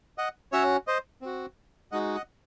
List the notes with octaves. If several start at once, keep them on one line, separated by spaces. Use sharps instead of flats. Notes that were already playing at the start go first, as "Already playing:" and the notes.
D#5 F#5
C#4 F#4 C#5 E5
C5 D#5
C4 F#4
G#3 D#4 F#4 D#5 F#5
D#5 F#5